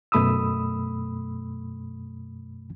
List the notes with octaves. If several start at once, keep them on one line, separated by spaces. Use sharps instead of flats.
F#2 B2 A3 B5 D#6 E6